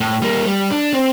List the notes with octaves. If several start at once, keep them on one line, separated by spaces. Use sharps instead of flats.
A2
G3 A#3
G3
D4
C4